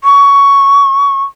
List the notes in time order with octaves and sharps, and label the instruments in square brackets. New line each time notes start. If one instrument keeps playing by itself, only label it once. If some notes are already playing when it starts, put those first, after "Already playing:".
[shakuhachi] C#6